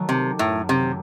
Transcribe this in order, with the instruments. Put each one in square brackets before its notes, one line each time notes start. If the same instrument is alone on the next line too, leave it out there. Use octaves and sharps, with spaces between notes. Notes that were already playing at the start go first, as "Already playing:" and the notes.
Already playing: [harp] D#3 F#3 A3
[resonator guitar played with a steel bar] C3
[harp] F#2 [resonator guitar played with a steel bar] A2
[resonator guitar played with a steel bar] C3
[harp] D#3 A3